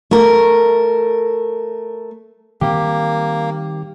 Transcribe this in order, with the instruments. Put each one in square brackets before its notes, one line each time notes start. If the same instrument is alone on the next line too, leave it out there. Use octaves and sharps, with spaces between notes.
[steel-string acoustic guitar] A3 A#4
[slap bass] D#3 G3 C4 [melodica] A#3 [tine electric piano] G4